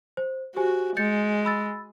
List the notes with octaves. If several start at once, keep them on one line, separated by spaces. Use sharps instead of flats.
C5
F#4 G4 C5 G#5
G#3 G6 A6 C#7
B5 E6 A6